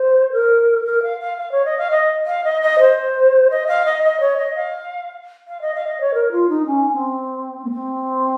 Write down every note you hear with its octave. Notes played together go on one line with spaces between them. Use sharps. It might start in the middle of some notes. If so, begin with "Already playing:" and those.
Already playing: C5
A#4
A#4
F5
F5
F5
C#5
D#5
F5
D#5
F5
D#5
D#5
C5
D#5
F5
D#5
D#5
C#5
D#5
F5
F5
D#5
F5
D#5
C#5
A#4
F4
D#4
C#4
C4
A#3
C4